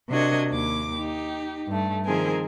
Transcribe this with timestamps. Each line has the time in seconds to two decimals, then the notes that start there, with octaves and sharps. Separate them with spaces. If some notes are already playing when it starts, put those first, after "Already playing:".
0.10 C3 D4 F#4 A#4 D#5 G#6
0.51 D#2 D6
0.96 D#4 G4
1.67 G2 A3
2.05 D#3 F3 C4 G#4 A#4 G#5